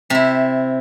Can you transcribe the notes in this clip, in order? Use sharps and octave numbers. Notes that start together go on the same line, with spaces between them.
C3 E4